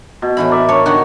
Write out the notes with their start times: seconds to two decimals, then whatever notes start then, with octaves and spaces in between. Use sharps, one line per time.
0.22 B2
0.37 A2 E3 E4 B5
0.50 A#4 D5 E5
0.69 D4 C#5
0.86 D3 D#3 D#4 F#4